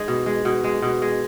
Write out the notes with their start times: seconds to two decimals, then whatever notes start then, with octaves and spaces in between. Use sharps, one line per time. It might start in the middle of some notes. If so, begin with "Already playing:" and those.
Already playing: G#3 D#4
0.08 B2
0.26 G#3
0.45 B2
0.64 G#3
0.82 B2
1.02 G#3